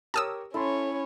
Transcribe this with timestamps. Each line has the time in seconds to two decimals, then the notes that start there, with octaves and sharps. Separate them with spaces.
0.14 G4 A#4 C#5 A5 D#6 E6
0.54 C#4 E4 A4 C#5 C6